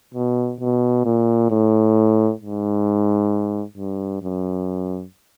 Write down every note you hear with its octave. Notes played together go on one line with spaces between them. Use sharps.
B2
B2
A#2
A2
G#2
G2
F#2